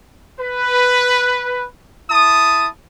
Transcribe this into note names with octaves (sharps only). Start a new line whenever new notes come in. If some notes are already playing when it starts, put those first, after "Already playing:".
B4
E4 A5 D#6